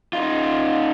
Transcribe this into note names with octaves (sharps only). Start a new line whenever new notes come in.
D#4 F4